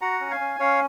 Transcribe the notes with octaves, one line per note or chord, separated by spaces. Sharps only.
F#4 F#5 A#5
C#4
F5 G#5
C#4
C#4 C#5 F5